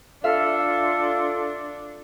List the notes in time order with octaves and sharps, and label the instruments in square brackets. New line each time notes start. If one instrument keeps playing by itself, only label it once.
[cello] D4 [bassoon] F4 [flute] A4 [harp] E5 F5